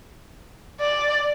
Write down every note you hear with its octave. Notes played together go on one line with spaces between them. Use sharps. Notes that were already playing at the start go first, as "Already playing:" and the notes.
D5